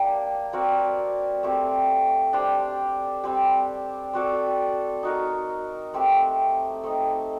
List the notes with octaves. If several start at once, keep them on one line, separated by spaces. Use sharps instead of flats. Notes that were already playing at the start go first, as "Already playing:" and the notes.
Already playing: A#3 D4 G4
C4 F#4 A#4 D5
A3 C4 G4
D4 G4 C5
G3 C4 G4
C4 F#4 A4 D5
D#4 F#4 A#4
A3 C4 G4
A3 C4 D#4